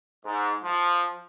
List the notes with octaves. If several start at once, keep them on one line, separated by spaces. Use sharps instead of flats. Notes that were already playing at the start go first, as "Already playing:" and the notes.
G#2
F3